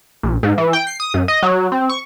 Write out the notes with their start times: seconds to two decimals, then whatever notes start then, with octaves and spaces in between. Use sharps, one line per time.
0.23 A#1
0.43 G#2
0.58 E3
0.73 G5
0.87 C7
1.00 D#6
1.14 F#2
1.28 D#5
1.43 F#3
1.72 C4
1.89 C#6